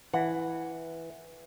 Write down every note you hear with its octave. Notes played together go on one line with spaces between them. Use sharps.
E3 F#5